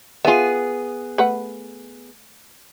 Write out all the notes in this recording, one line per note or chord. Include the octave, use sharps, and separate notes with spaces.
B3 F4 G#4 E5
A3 B4 F#5